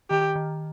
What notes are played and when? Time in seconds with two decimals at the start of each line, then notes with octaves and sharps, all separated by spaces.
0.10 D#3 G4
0.36 D#3